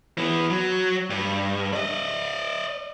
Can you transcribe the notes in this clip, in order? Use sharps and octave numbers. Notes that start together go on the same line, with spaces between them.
E3 B3
F#3
G2
D5 D#5